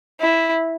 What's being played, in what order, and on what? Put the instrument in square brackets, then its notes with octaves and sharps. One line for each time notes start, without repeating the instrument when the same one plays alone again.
[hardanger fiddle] E4